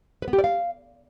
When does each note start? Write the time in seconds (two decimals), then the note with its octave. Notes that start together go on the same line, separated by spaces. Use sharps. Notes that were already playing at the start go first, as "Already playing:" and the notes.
0.22 B4
0.28 B3
0.33 G4
0.38 D5
0.44 F5